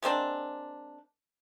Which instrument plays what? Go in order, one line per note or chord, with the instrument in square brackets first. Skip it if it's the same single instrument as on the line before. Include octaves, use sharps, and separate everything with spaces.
[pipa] G#3 A#3 C4 D4